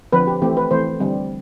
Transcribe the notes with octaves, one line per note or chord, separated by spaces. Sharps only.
D3 F3 C4 B4
G4
E3 A3 C4 G4
B4
E3 A3 C4 C5
D3 G3 C4